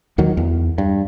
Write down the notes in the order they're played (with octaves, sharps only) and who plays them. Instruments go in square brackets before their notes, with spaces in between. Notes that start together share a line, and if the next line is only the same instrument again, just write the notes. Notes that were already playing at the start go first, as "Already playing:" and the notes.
[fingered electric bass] D#2 D#3 F#3
E2
G2